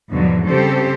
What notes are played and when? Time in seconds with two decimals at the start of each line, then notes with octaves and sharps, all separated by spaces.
0.10 E2 G#2 B2 D3 F3 F#3
0.49 C#3 G3 C4 G4 A4 C5